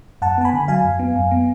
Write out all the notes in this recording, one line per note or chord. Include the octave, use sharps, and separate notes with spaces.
F#2 F#5 A5
B3 A5
G#5 B5
D3
F#3 F5 G#5
F#2
B3
F#2
B3